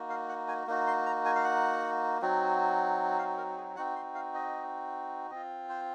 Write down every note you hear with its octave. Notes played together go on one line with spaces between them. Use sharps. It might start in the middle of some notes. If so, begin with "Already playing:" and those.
Already playing: A#3 D#4 F#4
F5
F#5
G#5
A#3 D#4 F#4
C6
A#5
G#5
F5
F#5
F#3 C4 D#4 F#4
F5
A#4
G#4
C4 D#4 F#4 F#5
C6
F5
D#5
C4 F4 D#5
C5